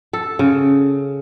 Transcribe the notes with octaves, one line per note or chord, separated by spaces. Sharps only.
A4
C#3